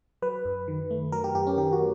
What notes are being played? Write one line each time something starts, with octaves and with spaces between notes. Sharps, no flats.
F#3 B4
F#2
D#3
A3
F#3 A#4
G4
F#2 G4
C#4
D#3 G4
F#4